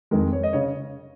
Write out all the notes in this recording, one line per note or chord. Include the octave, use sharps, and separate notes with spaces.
F2 D#3 G#3 A#4
C#5
D#5
C#3 C#5